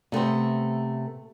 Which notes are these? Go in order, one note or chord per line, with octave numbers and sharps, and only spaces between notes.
C3 A3 B3 C5